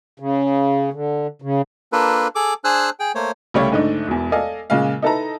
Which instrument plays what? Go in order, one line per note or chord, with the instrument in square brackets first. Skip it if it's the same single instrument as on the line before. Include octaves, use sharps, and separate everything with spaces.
[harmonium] C#3
D3
C#3
[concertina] A#3 D4 F4 A4 B4
G#4 A4 D6
D4 G#4 C5 G#5 E6 F#6
G#4 G5
A3 A#3 C5 C#5
[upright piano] C2 C#3 G3 A3 C#5 F5
G#2 D3 A3 D4 D#4
E1 E2
A4 D5 D#5 F5 G#5
A#2 C#3 G#3 F5
D#4 E4 A4 B4 A5 A#5